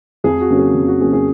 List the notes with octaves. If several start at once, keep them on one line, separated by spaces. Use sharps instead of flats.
F2 G#4
F#4
C#3 F#3 A#3 C#4
G#4
F2
F#4
C#3 F#3 A#3 C#4 G#4
G#4